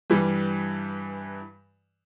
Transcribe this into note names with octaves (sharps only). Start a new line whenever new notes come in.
G2 E3 G3